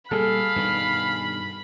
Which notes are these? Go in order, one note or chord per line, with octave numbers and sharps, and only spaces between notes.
A#2 G3 G#4 A4 F5 B5
G2 B2 D#3